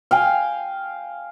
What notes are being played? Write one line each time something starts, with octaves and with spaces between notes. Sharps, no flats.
F5 G5 G#5